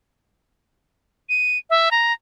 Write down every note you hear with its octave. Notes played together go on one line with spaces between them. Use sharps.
D#7
E5
A#5